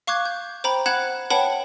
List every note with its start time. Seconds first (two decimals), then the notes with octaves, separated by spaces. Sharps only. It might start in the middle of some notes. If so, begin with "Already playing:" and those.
0.07 F5 C#6 D6 F#6 G#6
0.26 G6
0.64 C5 G5 A#5 B5
0.86 F#5 B5 F#6 G#6 E7 F#7
1.30 B4 C#5 F#5 G5 A5 B5